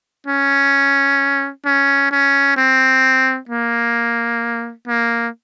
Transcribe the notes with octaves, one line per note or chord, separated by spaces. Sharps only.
C#4
C#4
C#4
C4
A#3
A#3